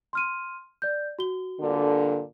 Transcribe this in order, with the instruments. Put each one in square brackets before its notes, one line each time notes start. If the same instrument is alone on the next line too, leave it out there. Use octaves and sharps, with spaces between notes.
[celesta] C6 F6 D#7
D5 G6
F#4 G7
[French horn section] G2 A#2 D3